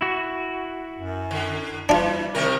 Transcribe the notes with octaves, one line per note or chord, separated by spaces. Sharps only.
E4 F#4
F#2
D3
E3 G3 D4 F4 D5
C3 D#3 A#4